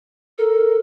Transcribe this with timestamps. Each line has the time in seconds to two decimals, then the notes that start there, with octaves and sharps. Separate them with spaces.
0.38 A4 A#4